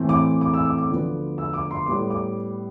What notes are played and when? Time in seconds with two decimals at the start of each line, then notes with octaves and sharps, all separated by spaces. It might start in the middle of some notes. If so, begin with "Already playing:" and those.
Already playing: A2 E3 A3 C4
0.09 D6
0.41 D6
0.54 E6
0.65 D6
0.78 D6
0.89 D2 D3 F3 B3
1.38 E6
1.53 D6
1.71 C6
1.86 A2 G3 B3 D6
2.10 D6